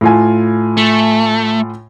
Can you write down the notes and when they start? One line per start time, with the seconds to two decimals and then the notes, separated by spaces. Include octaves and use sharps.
0.01 A2 F4 G#5
0.77 A3